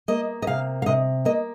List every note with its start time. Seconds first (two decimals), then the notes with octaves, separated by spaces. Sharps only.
0.08 A#3 D#5
0.42 D#5
0.47 C3 F5
0.82 F5
0.86 C3 D#5
1.25 A#3 D#5